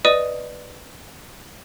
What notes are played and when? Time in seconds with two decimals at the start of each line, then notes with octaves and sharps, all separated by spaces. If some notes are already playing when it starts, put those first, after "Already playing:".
0.05 B4 D5 D#5 D#6 D#7